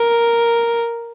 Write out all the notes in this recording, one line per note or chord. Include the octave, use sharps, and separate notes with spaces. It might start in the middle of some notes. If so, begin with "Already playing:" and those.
Already playing: A#4